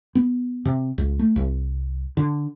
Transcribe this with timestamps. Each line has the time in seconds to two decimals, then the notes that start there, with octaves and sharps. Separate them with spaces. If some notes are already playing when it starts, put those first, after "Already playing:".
0.15 B3
0.65 C3
0.98 C#2
1.19 A3
1.36 C2
2.17 D3